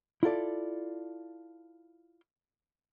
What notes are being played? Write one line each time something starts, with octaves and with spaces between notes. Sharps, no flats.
E4 F4 A4 D5